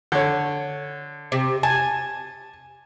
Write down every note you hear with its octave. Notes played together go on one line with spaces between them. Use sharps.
D3 C#5
C3
G#5 A5